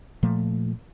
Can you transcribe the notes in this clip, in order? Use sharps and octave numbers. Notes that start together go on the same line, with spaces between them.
A#2 F3 A3